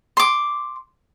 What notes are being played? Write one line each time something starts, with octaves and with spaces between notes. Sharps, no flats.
C6 D6